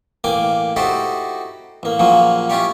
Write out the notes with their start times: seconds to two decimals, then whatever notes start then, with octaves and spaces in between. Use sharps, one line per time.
0.24 A1 A#3 G5 G#5 D6
0.76 D#4 E4 F#4 G4 A4 C5
1.83 A1 A#3
1.99 A#2 C#3 F3 F#3 A#3
2.50 C#4 E4 F4 G4 C#5